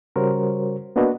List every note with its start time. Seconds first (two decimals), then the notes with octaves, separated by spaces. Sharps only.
0.16 C#3 G3 F#4 A#4 C5 C#5
0.96 A#3 B3 D4 F#4 B4 D#5